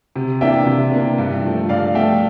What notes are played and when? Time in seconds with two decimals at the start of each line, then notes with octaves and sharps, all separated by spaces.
0.16 C3
0.41 E3 A#3 D4 E5 G5
0.66 C3
0.92 E3 A#3 D4
1.18 G2
1.44 F3 A3
1.69 G2 D5 F5
1.95 F3 A3 E5 G5